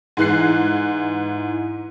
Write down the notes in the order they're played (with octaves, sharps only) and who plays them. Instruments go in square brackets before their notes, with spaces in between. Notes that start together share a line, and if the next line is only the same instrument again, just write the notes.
[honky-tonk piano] G#2 E3 F#6 C7